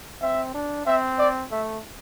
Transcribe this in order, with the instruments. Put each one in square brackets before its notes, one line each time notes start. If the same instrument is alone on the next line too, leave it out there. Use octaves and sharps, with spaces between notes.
[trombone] C4 [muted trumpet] E5
[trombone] D4
[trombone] C4 [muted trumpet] E5
[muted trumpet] D5
[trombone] A3 [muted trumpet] E5